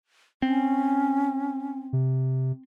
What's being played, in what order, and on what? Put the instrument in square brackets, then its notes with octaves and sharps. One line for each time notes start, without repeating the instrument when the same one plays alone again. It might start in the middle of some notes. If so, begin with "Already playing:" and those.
[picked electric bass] C4 [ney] C#4
[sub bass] C3